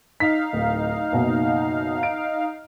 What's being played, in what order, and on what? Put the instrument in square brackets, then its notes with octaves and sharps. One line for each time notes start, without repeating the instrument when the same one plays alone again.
[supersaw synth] D#4 F5 [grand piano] B6
[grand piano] D1
F#1 B2
D7